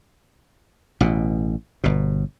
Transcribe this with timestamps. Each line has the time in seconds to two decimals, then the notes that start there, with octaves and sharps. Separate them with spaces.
1.00 A1 B2
1.84 G1 B2